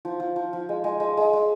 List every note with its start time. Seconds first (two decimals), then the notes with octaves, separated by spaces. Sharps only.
0.05 F3
0.20 F3
0.36 F3
0.53 F3
0.69 G#3
0.84 G#3
1.00 G#3
1.17 G#3
1.33 G#3